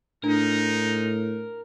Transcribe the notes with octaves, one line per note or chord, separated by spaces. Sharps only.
A2 G#3 D4 D#4 A#4